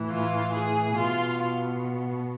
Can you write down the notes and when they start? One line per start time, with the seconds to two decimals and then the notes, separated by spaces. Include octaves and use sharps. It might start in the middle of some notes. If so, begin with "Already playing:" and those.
Already playing: A2 E3
0.10 F4
0.54 G#4
0.97 B2 F4